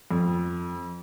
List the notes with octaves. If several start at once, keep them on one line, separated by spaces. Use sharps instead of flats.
F2